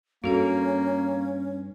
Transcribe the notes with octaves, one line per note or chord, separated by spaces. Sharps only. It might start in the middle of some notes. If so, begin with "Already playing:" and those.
G2 A#3 C#4 F#4 A4 F5